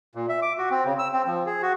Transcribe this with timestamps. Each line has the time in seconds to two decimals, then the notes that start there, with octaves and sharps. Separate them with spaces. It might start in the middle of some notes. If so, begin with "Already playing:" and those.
0.15 A#2
0.29 E5
0.42 D6
0.58 F#4
0.71 C4
0.85 C#3
0.99 E6
1.13 C4
1.27 F3
1.46 G#4
1.62 F#4